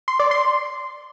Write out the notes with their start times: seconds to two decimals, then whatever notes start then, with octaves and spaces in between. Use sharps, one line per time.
0.08 C6
0.19 D5
0.31 C6